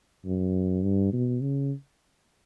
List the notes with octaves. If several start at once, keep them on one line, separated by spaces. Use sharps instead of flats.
F#2
G2
B2
C#3